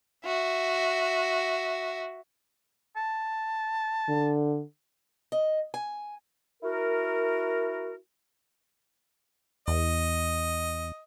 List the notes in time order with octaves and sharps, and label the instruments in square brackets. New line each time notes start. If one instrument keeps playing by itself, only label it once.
[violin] F#4 E5
[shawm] A5
[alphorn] D3
[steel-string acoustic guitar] D#5
G#5
[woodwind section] E4 F#4 A#4
[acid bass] E2 [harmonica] D#5